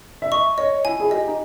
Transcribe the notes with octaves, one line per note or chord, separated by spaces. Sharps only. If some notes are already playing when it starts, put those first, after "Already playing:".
E5
D#5 C#6
C#5 D#5
E4 G#5
G#4
G4 D#5
D#4